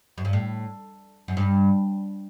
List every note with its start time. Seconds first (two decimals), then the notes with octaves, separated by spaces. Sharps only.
0.18 F#2
0.25 G2
0.33 A2
1.28 F#2
1.37 G2